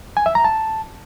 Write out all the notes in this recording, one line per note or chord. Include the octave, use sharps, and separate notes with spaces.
G#5
E5
A#5
A5